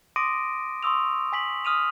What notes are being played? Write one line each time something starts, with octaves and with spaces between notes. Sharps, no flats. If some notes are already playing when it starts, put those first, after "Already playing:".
C6 D6 D#6 A#6 D7 D#7
C6 C#6 D#6 E6 F7
G#5 B6 F#7
D#6 F6 D#7 F7